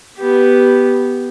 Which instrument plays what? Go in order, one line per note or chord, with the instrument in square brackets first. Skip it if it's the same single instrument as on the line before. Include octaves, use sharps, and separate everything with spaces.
[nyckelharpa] B3 G4